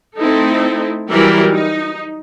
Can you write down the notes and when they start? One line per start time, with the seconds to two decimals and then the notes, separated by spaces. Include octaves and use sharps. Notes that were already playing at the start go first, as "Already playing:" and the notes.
0.17 A3 C4 D#4 E4 A4
1.10 E3 F#3 G3 E4 G4 A#4
1.53 D#4